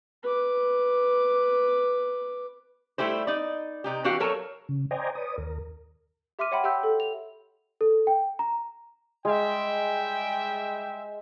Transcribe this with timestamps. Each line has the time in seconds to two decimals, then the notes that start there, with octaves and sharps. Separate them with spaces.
0.23 B4 D6
2.98 G3 A3 E4 G4 C5
3.27 D#4 D5
3.84 C3 D#4 G4
4.04 E3 D4 F#4 G4 F5
4.20 F#3 A4 A#4 C#5
4.69 C#3
4.91 C5 D5 D#5 G5 G#5 A#5
5.15 B4 C#5 D5 D#6
5.38 D#2 A#4
6.39 G4 E5 C6 D6 F6 D#7
6.51 C#5 E5 F#5 G5 B5 C6
6.64 G4 E5 G5 C6 E6 G6
6.83 A4
7.00 F7
7.81 A4
8.07 G5
8.39 A#5
9.25 G3 G#3 E5 G5